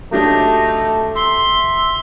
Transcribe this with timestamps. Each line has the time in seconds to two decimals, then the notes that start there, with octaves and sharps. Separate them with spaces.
0.13 F#3 A3 D4 D#4 G4
1.16 E5 C6